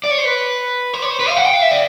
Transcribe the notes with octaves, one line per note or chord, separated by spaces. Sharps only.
D5
C#5
C5
B4
C5
C#5
C5
B4
F5
F#5
G5
F5
E5
D5